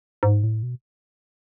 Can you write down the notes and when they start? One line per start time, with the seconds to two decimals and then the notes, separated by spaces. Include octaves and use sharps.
0.23 G#2
0.44 A2
0.63 B2